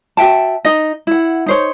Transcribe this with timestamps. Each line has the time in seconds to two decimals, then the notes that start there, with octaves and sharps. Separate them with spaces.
0.17 F#4 E5 G5 A5
0.65 D#4 D#5
1.07 E4 F#5
1.46 D#4 C5 C#5